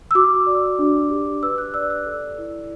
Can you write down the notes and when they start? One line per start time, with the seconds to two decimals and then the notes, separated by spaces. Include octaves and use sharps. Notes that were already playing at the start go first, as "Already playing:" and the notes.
0.11 E6
0.15 F#4 D6
0.47 D5
0.79 D4
1.10 G4
1.43 B4 E6
1.58 F#6
1.74 D5 E6
1.90 E6
2.06 A4
2.38 E4